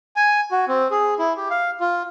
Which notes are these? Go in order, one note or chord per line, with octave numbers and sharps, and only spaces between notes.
G#5
F#4
C4
G#4
E4
G4
F5
F4